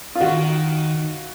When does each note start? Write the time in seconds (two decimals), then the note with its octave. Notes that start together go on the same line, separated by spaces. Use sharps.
0.15 F4
0.21 D#3 F#4